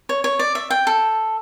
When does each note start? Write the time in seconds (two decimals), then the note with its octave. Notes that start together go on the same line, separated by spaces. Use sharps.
0.09 C#5
0.24 C#5
0.39 D5
0.55 E5
0.70 G5
0.87 A4